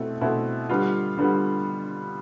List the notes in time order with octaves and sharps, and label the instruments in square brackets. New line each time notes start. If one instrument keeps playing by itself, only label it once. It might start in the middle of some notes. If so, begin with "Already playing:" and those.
Already playing: [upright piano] B2 A3 C4 E4
B2 A3 C4 E4
D3 G3 B3 F4
D3 G3 B3 F4